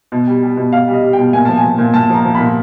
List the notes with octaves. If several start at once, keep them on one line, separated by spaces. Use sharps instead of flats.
B2
G3
G3
B2
B2 F5
G3
D#5
G3
G5
B2
A#2 G#5
F3 A5
G#5
F3
A#2
A#2 A5
F3 A#5
F3
B5
A#2